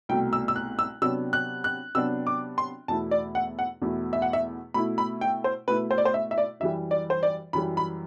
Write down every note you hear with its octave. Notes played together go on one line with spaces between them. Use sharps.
C2 B2 A3 G5
E6
E6
F#6
E6
C3 F#3 B3 D4 E6
F#6
F#6
C3 F#3 B3 D4 E6
D6
C6
E2 B2 A3 E4 A5
D5
F#5
F#5
E2 B2 A3 E4
E5
F#5
E5
B2 A3 E4 B5
B5
G5
C5
B2 A3 E4 B4
C5
D5
C5
E5
E5
D5
F#2 E3 G3 E5
D5
C5
D5
F#2 E3 G3 B5
B5